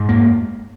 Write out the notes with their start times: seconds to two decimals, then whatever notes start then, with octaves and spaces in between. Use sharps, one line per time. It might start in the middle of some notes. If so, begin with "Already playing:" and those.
Already playing: G#2
0.09 F2 A#3